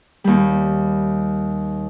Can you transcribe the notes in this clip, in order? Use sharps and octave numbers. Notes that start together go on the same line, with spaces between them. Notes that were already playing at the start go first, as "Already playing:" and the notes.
D#2 G3